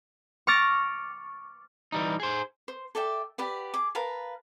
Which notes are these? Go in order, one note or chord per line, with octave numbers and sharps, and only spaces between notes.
C#6 D6 F6 A6 A#6
E3 G3 D#4
G#4 C5
C5
A4 D5 E5 G5
G4 B4 D5 F#5
G#4 D6
A#4 B4 F5 A5